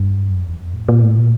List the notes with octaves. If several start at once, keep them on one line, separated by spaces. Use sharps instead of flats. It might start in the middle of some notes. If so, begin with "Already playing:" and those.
Already playing: G2
F#2
F2
E2
F2
A2
A#2
A2
A#2